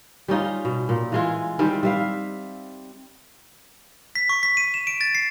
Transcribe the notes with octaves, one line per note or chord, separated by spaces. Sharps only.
G3 C#4 D#4 F4
B2
A#2
E3 G#3 F4
D#3 G3 C4 E4
G3 E5 F5
B6
C#6
B6
D#7
E7
D7
A6
C7